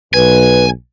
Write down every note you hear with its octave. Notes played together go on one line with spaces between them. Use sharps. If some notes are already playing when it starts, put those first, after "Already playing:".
B1 B4 G#5